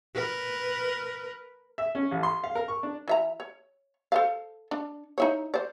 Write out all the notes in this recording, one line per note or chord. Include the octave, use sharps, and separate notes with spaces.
A#4 B4
E5
C#4
A1
C6
F5
A#4
C#6
D4
E3 E5 A#5
C#5
A4 C5 F5
D4
D#4 E4 C#5
C5 D5